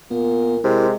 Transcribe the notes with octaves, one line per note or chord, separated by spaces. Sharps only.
A#2 B3
C3 G#3 E4 G4 A#4